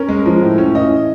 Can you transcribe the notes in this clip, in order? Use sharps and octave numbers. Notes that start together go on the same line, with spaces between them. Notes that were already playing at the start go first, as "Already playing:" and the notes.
Already playing: C#4 A#4
G#3
F3
A2
C#4
E3 D#5